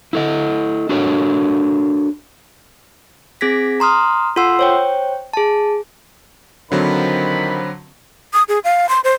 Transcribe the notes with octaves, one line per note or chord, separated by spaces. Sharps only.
E4 A4 D#5
D4 F#4 A4 A#4 C#5
C4 G#4 G#6 A#6 B6
A#5 C6 D#6 F6
F4 A4 F#5 C6 E6
C5 C#5 G5
G#4 A5
D3 D#3 F3 F#3 C4 B5
D#6
G#4
F5
C6
C5